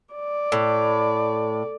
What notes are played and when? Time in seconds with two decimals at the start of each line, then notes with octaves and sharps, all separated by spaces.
0.14 D5
0.52 A2